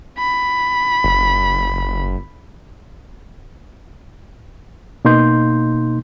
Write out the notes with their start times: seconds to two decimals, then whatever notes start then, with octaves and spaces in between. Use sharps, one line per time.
0.18 B5
1.04 F#1
5.05 B2 A#3 D#4 C6 G6